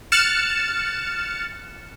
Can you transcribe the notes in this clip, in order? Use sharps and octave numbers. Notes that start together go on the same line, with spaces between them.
F6 F#6 A6 C#7 E7